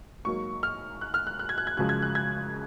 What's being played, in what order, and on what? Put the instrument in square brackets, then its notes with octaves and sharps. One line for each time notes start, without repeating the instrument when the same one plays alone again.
[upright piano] G#2 F#3 A#3 C#6
F6
F#6
F6
F#6
F#6
G#6
F#6
G#6
F#2 C#3 F3 G#3 F#6
G#6
F#6
G#6